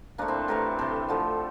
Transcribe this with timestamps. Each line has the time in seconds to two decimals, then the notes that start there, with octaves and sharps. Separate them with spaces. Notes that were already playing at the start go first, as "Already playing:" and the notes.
0.18 A#2 F3 A3 A#3 D4
0.28 C4 E4
0.48 A2 E3 A3 G4 A#4
0.78 C3 E3 A3 A4 C5
1.09 D3 F3 A3